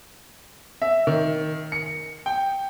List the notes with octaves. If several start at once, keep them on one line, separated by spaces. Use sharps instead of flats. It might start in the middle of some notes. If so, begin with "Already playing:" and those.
E5
D#3
C#7
G5